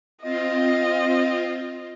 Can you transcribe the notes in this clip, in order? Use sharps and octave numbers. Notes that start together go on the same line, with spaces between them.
C4 F4 D#5